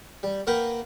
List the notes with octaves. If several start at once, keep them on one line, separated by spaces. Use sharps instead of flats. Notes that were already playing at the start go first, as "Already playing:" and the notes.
G3
A#3 A#4 B4 F#5 G5